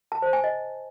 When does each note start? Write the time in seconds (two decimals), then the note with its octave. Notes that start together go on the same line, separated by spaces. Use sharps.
0.12 A5
0.22 C5
0.33 G#5
0.44 D#5